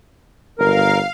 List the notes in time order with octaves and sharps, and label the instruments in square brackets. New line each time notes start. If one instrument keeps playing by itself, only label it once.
[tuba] G1 [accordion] A#4 [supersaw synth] F5